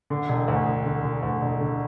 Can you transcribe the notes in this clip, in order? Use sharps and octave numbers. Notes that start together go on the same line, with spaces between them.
D3
E1
D2
E1
D3
E1
D2
E1
D3